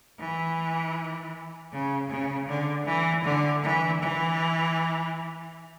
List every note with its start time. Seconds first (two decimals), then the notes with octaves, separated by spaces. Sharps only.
0.20 E3
1.72 C#3
2.10 C#3
2.48 D3
2.86 E3
3.24 D3
3.63 E3
4.01 E3